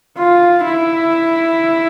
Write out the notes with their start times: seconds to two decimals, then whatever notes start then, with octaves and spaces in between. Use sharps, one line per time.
0.18 F4
0.64 E4